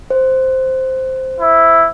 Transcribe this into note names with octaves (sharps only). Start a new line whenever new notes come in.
C5
E4